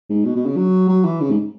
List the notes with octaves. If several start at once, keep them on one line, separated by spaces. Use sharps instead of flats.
G#2
B2
B2
C#3
F#3
F#3
E3
C#3
G#2